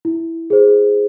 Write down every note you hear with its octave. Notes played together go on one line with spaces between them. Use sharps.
E4
G#4 C5